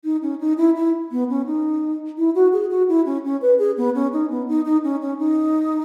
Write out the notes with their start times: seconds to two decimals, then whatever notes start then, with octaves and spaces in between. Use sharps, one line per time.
0.04 D#4
0.22 C#4
0.41 D#4
0.57 E4
0.76 E4
1.12 B3
1.30 C#4
1.46 D#4
2.18 E4
2.35 F#4
2.53 G#4
2.70 F#4
2.89 E4
3.06 C#4
3.25 C#4
3.42 B4
3.59 G#4
3.77 B3
3.95 C#4
4.13 D#4
4.30 B3
4.48 D#4
4.65 D#4
4.84 C#4
5.01 C#4
5.19 D#4